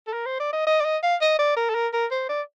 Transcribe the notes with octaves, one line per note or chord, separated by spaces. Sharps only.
A4
A#4
C5
D5
D#5
D#5
D5
D#5
F5
D#5
D5
A#4
A4
A#4
A#4
C5
D5